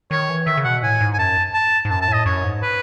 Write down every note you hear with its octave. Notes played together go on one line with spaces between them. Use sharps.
D#3 C#5
E3
D#3 E5
C#3
B2 F#5
A2 G#5
G#2
G#5
F#2 A5
A5
G#2
F#2 A5
A5
A2
D#5
F#2 C#5
G#2
B4